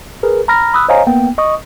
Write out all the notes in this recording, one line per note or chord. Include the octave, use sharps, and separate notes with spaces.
G#4 A#4 B4
A#5 B5 F6 A#6
B5 D#6 E6 F#6
C5 C#5 D#5 F5 G#5 A#5
A#3 B3 G5
D#5 C#6 D#6